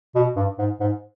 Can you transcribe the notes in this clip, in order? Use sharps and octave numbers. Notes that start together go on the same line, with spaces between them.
B2
G2
G#2
G#2